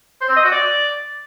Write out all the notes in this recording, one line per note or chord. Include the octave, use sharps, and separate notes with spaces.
C5
C4
D#5
F#4
D5